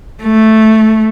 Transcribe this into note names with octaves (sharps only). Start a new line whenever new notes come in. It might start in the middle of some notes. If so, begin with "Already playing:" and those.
A3